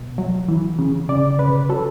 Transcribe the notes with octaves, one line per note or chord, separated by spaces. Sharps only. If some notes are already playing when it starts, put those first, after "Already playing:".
Already playing: B2
F#3
E3
C#3
C#3 D5
C#3 B4
F#3 A4